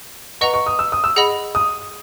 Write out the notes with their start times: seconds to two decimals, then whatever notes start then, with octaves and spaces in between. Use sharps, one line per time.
0.41 B4 D#5 F#5 A#5 C#6
0.54 C#6
0.66 D#6
0.79 E6
0.92 D#6
1.04 E6
1.16 G#4 D#5 F#5 B5
1.55 D#6